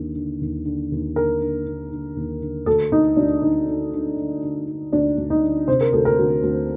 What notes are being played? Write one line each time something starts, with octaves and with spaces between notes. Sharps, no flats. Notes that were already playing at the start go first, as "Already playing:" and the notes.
Already playing: D#2 D3
D3
D#2
D3
D#2
D3 A#4
D3
D3
D3
D#2
D3
D2 A4
D2 D#4
D2 D4
D3 D#4
D3
D3
D3
D3
D3
D2 D4
D2
D#4
D3
C3 C5
A#4
D2 A4
A#4
D2
D2